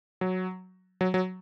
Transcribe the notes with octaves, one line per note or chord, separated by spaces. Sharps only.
F#3
F#3
F#3